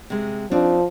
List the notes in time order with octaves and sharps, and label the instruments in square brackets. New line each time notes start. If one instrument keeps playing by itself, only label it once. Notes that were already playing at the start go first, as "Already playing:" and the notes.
[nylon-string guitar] C3 G#3
[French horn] F3 [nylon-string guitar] C4 D4 D#4